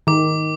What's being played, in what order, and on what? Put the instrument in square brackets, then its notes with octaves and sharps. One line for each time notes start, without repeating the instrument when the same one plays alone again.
[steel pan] D#3 [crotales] D6